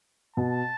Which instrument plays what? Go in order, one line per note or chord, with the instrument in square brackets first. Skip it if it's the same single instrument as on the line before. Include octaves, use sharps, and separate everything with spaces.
[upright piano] B2 [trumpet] A5